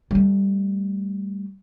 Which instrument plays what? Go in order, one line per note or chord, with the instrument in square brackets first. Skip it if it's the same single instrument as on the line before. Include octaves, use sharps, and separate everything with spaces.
[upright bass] G3 A3